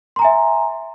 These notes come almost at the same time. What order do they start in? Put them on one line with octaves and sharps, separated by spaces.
C6 A#5 G#5 E5